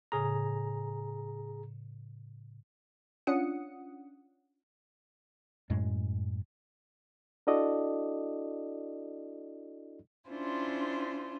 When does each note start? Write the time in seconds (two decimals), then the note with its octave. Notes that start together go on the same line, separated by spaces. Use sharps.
0.12 A2 C#3 G#4 A#5 D#6
3.27 C#4 D4 F4 F#5 D#6 C#7
5.70 F#2 A2 G#3
7.47 D4 E4 F#4 A4 D5 D#5
10.29 C#4 D4 E4 F4 C5